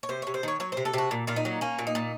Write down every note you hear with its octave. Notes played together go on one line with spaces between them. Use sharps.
C#5
C3 C5
C3 C#5
C5
D#3 C#5
F#3 C#5
C3 C5
A4
C3 F#4
A#2
A#2 F4
D#4
F#3
A#3 C#4
A#2
D#4
A#2